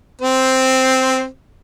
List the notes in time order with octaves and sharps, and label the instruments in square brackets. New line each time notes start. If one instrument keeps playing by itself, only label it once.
[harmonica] C4 C5